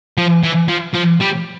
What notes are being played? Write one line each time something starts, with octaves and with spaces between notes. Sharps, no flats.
F3
E3
F3
F3
G3